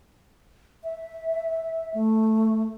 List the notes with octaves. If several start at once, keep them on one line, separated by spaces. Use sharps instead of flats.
E5
A3